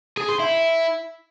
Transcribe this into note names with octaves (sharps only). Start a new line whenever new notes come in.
G#4
C5
E4